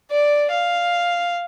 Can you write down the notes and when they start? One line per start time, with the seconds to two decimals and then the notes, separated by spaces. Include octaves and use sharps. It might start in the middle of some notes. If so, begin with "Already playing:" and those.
0.11 D5
0.51 F5